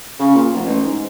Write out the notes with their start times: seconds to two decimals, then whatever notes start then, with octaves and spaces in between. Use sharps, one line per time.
0.19 C#3
0.35 A#2
0.54 F1
0.66 A1
0.84 G#2